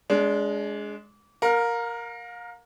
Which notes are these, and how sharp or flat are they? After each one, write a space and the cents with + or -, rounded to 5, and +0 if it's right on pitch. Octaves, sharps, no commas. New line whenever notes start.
G#3 +5 D4 -30
A#4 +0 F5 +35